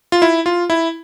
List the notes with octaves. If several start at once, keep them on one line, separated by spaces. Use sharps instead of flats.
F4
E4
F4
E4